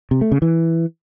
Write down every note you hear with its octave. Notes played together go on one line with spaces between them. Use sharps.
C3
A3
C#3
E3